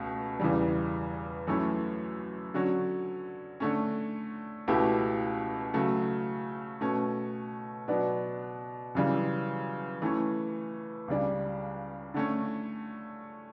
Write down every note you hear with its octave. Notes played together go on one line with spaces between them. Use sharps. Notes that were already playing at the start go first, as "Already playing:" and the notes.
Already playing: C#2 B2 A3
E2 C#3 E3 G3
F#2 E3 A3 C#4 E4
D3 F#3 C#4
D3 A3 C#4
C#2 B2 A3 E4 G4
C#3 F#3 A3
B2 A3 C#4
B2 F#3 B3 D4
F#2 C#3 E3 G3
E3 A3 C#4
C#2 C#3 G3 D4
D3 A3 C#4